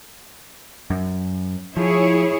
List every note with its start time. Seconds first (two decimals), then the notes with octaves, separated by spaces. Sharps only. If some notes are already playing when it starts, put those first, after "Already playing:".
0.90 F#2
1.77 F3 E4 G#4 C#5